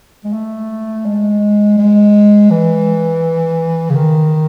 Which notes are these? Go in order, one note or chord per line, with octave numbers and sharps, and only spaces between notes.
G#3
A3
G#3
G#3
E3
C#3
D#3